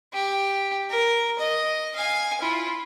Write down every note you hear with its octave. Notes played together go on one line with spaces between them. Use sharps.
G4
A#4
D#5
F5 G#5
E4 F4